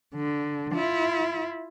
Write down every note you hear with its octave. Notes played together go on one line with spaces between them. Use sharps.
D3
E4 F4